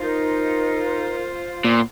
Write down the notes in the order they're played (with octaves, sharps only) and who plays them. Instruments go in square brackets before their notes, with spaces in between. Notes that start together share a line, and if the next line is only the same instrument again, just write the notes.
[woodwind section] D#4 [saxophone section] F4 C5 [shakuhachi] A#4
[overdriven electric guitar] A#2 [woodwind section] B3 C6